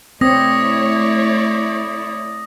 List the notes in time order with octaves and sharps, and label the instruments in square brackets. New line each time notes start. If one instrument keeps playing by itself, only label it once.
[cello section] A3 E4 C#5 [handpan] C4 [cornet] D5 [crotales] D#6 A#6